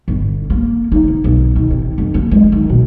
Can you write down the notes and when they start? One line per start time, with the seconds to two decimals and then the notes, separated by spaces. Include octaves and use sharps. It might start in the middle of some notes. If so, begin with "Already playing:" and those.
0.08 G1
0.50 A#3
0.92 D#4
1.08 C3
1.24 B1
1.56 D#3
1.71 C3
1.98 F1
2.14 A#3
2.31 G#3
2.52 D#3
2.69 B2